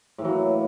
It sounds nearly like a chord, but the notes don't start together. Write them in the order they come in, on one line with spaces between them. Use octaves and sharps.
A2 E3 F#3 A#3